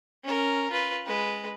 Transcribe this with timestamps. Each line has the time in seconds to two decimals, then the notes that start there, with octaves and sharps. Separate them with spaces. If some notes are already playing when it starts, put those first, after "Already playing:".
0.24 C#4 A#4
0.71 F4 B4
1.06 G#3 B4